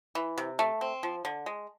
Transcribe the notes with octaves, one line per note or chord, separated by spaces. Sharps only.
E3
C3
A3
C4
F3
D3
G#3